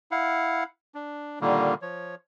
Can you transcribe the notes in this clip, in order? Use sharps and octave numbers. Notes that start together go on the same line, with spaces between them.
E4 F5 F#5
D4
A#2 D3 D#3 G3 A#3
F3 C#5